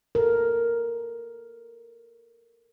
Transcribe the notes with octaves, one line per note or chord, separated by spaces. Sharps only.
A4 A#4